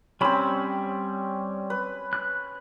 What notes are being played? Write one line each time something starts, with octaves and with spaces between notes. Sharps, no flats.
G3 C4 C#4 B5 E6
B4
F#6